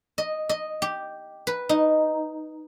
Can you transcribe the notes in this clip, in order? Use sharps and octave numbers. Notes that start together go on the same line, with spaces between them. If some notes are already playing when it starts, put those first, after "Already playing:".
D#5
D#5
G4
B4
D#4